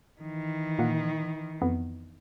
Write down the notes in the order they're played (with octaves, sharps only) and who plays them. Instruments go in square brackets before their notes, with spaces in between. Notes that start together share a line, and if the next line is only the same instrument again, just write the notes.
[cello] D#3 E3
[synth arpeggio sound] A#2 A#3 F#5
F2 B3